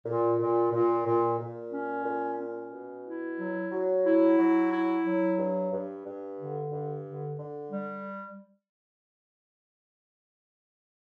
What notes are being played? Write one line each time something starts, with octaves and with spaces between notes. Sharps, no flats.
A#2
A#2
A#2
A#2
A#2
C#4
A#2
C#4
B2
E4
F#3
F#3
E4
F#3
E4
F#3
G2
G2
G2
D3
G2
D3
D3
G3